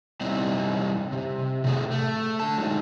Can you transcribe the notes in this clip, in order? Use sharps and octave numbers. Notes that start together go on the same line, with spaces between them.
G3 C4 D#4 E4
C3
A2 C3 A3 G#4
A3
D3 A5
F#3 G#3 D#4